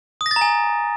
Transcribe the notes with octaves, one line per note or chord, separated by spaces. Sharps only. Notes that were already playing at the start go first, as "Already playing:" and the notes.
D#6
A#6
A6
A#5
G#5